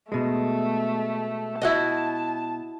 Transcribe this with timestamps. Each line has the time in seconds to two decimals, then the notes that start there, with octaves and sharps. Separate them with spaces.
0.12 B2 G#3 A3
1.62 E4 F#4 D#5 A5